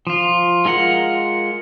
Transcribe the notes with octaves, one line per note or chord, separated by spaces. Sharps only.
F3 F4
G#3 F4 A#4 F#5